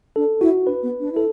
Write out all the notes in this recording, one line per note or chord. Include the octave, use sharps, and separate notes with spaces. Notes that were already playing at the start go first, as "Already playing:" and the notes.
D4 A4
E4 F#4
D4 B4
B3
D4
E4 A4